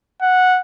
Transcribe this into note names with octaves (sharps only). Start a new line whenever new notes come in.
F#5